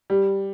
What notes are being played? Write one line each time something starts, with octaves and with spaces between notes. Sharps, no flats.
G3